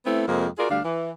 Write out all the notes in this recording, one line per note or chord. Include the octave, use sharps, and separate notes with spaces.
A3 B3 C4 E4
F2 C3 F3 G#3 A#3
F4 F#4 G#4 A#4 D5
D2 G3 D4 F5
E3